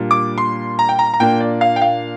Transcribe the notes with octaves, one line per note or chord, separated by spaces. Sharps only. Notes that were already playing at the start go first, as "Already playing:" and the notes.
Already playing: A#2 G3 A#3 D4
D6
C6
A#5
G5
A#5
A#5
A#2 A#3 D4 G5
D5
F5
G5
F5